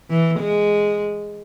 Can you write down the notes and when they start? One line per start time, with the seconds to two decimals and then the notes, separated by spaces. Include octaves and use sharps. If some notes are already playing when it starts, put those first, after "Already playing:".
0.10 E3
0.40 G#3